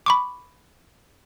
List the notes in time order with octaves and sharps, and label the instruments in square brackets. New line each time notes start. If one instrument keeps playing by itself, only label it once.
[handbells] B5 C#6 D6